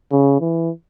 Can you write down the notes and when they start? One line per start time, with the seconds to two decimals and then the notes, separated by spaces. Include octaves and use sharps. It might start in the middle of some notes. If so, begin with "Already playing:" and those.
0.12 C#3
0.40 E3